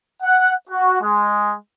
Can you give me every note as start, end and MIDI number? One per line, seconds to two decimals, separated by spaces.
0.22 0.53 78
0.70 0.98 66
1.01 1.53 56